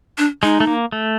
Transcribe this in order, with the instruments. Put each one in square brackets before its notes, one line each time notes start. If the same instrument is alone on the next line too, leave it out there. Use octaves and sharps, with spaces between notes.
[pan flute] D4
[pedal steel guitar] G#3 [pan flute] D#4
[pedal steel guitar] A3
A#3
A3